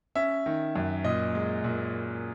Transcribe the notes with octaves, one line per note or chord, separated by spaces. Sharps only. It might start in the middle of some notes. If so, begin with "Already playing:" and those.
C#4 E5
D#3
F#2
A#2 D#5
G#3
A#2